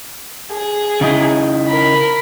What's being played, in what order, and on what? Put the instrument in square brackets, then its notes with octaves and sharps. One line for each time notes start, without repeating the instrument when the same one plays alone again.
[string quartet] G#4
[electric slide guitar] C#3 D#4 E4
[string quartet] A#4 B5